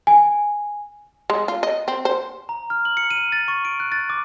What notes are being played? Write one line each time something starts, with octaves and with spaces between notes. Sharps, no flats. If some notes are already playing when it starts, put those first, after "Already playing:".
G#5
G#3
F4
D#5
C4
C5
A#5
F6
F#7
C#7
D#7
A6
C#6
D7
F#6
A6
D6